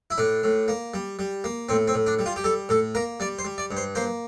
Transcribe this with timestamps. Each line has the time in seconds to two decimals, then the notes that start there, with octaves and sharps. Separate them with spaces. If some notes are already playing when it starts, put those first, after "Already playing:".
0.11 E4
0.18 A2 D4
0.43 A2
0.68 A#3
0.94 G3
1.19 G3
1.44 A#3
1.69 A2 C4
1.88 C4
1.94 A2
2.07 D4
2.19 G3
2.26 F4
2.36 G4
2.44 G3 A4
2.69 A2 A4
2.95 A#3 A#4
3.20 G3 D5
3.39 C5
3.45 G3
3.58 D5
3.71 G2
3.77 C5
3.95 A#3 C5